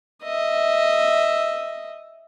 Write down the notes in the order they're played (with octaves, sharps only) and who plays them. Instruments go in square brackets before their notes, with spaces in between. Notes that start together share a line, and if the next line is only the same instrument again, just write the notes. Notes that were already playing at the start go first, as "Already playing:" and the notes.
[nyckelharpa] D#5 E5